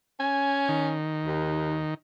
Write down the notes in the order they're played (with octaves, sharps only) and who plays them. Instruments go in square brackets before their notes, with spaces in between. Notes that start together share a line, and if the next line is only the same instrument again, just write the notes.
[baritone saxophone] C#4 [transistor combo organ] G#5
[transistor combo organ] D#3
[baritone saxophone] D#2